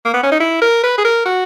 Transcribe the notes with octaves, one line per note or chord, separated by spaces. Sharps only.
A#3
B3
C#4
D#4
E4
A#4
B4
G#4
A#4
F#4